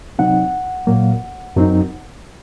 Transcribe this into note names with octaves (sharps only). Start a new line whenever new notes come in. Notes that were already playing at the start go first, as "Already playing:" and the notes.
C3 F#3 C4 D#4 F#5
A#2 F#3 A#3
F#2 F#3 C4 D#4